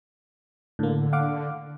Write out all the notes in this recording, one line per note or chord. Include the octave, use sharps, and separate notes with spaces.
A2 D3 A#3
F5 F#5 D6